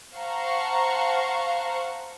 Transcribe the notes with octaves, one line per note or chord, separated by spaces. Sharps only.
C5 F5 F#5 A5 A#5 C#6